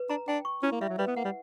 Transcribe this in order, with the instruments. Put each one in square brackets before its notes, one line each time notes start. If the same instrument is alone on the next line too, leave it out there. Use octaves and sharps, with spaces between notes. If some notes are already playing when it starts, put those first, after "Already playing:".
Already playing: [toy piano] B4
[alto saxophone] D4 [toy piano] A#5
[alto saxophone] D4 [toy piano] G5
[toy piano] C#6
[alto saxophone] C#4 [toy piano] E4
[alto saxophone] A#3
[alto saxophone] G3 [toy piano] E5
[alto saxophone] F#3
[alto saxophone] G3 [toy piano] B4
[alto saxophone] B3
[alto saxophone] A#3 [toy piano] F#5
[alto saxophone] G3